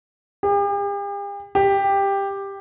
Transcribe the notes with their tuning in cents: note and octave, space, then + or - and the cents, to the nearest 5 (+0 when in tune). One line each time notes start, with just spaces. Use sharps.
G4 +45
G4 +10